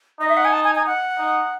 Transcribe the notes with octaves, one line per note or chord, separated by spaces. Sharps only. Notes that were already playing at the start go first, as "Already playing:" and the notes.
D#4 D#5
E5
F#5
G#5
A5
G#5
G#5
F#5
D#4